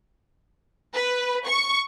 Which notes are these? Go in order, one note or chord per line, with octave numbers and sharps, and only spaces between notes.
B4
C#6